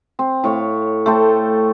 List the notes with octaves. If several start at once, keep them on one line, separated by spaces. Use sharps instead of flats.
C4
A2 C#5 F5
A3 A4 C5 G5